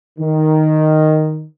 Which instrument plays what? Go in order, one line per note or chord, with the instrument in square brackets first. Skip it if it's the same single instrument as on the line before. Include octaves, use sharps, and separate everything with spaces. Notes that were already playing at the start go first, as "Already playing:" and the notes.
[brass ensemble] D#3